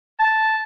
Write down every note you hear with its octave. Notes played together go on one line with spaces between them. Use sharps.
A5